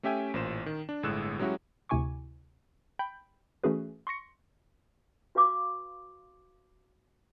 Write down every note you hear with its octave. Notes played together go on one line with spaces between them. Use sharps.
A3 C#4 G4 E5 G5 G#5
A1 A#2 C5 E7
D#3
D4
G1 A2 G#3 E6 F#6 E7
F#3 G#3 C#4 E4 F#4 G4
D2 C3 E4 G#5 C#6 D6
G5 B5 G6
E3 A3 C#4 F#4 G#4 B4
C6 C#6 A#6 C#7
F#4 B4 F5 C6 D6 E6